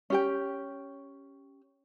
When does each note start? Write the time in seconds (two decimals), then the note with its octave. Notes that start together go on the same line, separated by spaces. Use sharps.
0.10 C#4 G4 G5